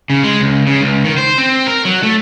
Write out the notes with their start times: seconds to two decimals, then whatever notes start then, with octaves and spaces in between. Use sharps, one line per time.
0.10 C#3
0.24 G#3
0.40 C#2
0.67 C#3
0.81 C#2
1.04 D#3
1.18 C5
1.38 C4
1.67 A#4
1.85 F#3
2.03 A3